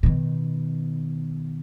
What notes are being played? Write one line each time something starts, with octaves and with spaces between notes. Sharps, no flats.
B2 D#3